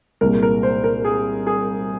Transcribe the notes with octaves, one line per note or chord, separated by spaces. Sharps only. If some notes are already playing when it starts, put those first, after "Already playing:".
C2 A#2 G#3 A#4
A#4
C5
A#4
G#4
G#4